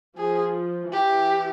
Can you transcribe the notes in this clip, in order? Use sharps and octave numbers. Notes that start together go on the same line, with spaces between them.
F3 G#4
E3 G4